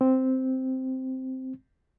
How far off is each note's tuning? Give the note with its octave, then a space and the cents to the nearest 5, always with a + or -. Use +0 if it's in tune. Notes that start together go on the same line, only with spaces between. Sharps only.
C4 -5